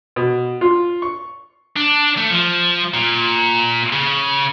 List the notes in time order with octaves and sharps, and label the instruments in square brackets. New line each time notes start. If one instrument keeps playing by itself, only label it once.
[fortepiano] B2
F4
C#6
[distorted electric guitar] D4
A3
F3
A#2
C#3